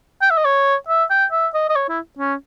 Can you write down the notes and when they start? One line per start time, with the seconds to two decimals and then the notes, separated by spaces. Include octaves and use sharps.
0.22 G5
0.30 E5
0.38 D#5
0.45 C#5
0.88 E5
1.10 G5
1.32 E5
1.54 D#5
1.69 D#5
1.76 C#5
1.89 E4
2.19 C#4